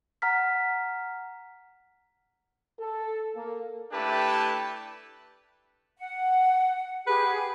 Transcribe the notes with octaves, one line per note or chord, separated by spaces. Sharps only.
F#5 A#5 F6 B6
A4
A#3
A3 D4 E4 G4 B4 A5
F#5
G4 G#4 B4 F#5